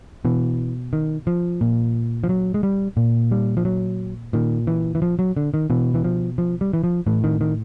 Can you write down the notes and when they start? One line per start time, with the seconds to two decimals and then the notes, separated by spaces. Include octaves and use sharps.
0.25 B2 E3
0.93 D#3
1.27 F3
1.61 A#2
2.24 F3
2.29 F#3
2.54 G#3
2.63 G3
2.97 A#2
3.31 G3
3.57 F3
3.65 F#3
4.33 A#2 D#3
4.67 E3
4.95 E3
5.02 F3
5.19 F#3
5.37 D3
5.54 D#3
5.70 B2 E3
5.94 E3
6.04 F3
6.38 F3
6.61 G3
6.73 E3
6.84 F3
7.07 A2 E3
7.24 D#3
7.41 D#3